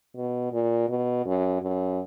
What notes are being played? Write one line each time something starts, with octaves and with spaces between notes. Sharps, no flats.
B2
A#2
B2
F#2
F#2